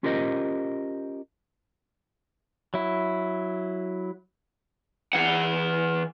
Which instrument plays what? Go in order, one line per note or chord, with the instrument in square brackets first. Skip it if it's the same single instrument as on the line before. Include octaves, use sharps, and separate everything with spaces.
[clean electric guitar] C#4 F4 G4 A#4 C5 D#5
[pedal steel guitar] F#3 E4
[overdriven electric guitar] E3 F#5